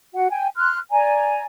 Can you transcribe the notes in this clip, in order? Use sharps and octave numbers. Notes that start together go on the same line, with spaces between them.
F#4 F#5
G5 G#5
C6 F6 F#6
D5 G#5 A#5